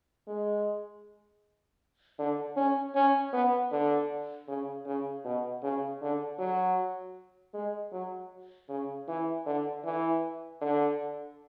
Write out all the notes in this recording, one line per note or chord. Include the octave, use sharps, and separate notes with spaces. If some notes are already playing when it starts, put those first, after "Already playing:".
G#3
D3
C#4
C#4
B3
D3
C#3
C#3
B2
C#3
D3
F#3
G#3
F#3
C#3
E3
D3
E3
D3